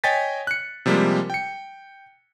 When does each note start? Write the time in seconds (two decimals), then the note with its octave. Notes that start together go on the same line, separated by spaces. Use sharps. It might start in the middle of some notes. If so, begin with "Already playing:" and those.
0.04 C#5 D#5 G5 G#5 A6 B6
0.47 F#6 C#7
0.86 C3 F3 G3 G#3 A#3
1.30 G5 C#7